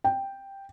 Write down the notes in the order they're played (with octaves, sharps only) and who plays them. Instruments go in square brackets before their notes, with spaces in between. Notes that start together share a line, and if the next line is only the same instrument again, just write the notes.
[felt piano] G5